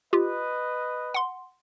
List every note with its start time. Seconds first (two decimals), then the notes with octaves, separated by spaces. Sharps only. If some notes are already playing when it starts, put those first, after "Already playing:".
0.13 F4 G4 B4 D#5
1.14 F#5 C6